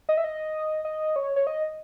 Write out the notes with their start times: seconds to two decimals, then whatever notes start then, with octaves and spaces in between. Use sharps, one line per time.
0.09 D#5
0.17 E5
0.24 D#5
0.85 D#5
1.16 C#5
1.36 C#5
1.47 D#5